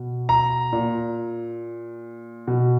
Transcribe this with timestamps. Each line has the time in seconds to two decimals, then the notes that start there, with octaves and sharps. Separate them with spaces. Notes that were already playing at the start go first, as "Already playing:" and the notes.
Already playing: B2
0.29 A#5
0.73 A#2
2.47 B2